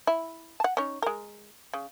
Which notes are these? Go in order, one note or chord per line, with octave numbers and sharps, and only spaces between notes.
E4
F#5 A5
C#4 D#4 C#5
G#3 A#4
C#3